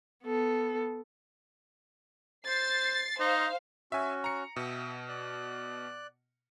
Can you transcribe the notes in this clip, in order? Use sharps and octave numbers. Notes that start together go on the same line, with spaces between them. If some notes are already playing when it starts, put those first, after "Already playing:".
B3 A4
C5 A6 C7
D#4 C5 F5
C#4 F#4 E5 G#5
A#5 C#7
B2 E5 G5 D#6
D5 F#6